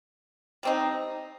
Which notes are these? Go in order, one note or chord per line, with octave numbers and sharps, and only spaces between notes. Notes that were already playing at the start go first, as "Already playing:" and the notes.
G3 C4 D#4